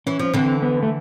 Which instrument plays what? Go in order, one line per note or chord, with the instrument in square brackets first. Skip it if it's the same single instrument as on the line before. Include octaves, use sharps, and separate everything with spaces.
[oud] E3 [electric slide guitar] C#4
[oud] F3 [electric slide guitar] C#4
[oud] D3 E3 [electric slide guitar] C4
[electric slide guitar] B3
A3